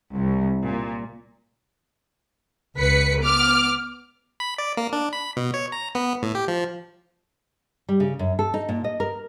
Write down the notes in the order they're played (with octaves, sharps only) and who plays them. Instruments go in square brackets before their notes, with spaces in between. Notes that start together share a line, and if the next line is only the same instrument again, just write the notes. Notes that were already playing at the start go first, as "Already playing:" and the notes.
[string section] C2
A#2
C#2 B4 B6 C#7
B3 D6 F6
[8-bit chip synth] B5
D5
A#3
D4
B5
B2
C#5
A#5
B3
A2
G4
F3
[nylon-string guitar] G3
C#3
F#2
A4
D#4
A#2
D#5
A#4